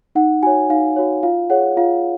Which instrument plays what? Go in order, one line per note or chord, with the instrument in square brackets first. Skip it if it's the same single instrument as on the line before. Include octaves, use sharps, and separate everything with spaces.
[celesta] D#4 F#5
F#4 C#5 G#5
D#4 F5
F#4 C#5
F4 F5
G#4 C#5 F#5
F4 F5